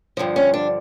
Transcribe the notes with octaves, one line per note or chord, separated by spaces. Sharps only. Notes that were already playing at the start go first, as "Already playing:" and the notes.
G2 D3 F3
C#4
D4